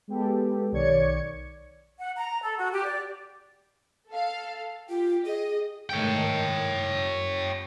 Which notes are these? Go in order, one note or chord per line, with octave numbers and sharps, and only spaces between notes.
G#3 B3 G4 A4
B1 D#3 C#5 D5 G#6 C#7
F#5
A#5
A4
F#4
G4
D5
A4 F5
F4 G4
G#4 D#5
G#2 D#3 A3 C#5 G5
F#2